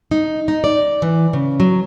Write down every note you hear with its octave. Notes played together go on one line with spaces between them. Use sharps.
D#4
D#4
D5
E3
C#3
F#3